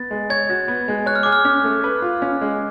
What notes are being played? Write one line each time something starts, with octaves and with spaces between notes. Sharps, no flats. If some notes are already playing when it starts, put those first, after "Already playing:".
Already playing: B3 A6
G#3
C#5 G#6
F#4
B3
G#3
C#5 F#6
F6
G#4 D6
F6
C#4
A3
B4
F4
C#4
G#3